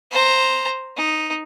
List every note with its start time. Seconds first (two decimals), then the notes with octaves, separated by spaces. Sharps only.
0.11 C5 A#5
0.97 D#4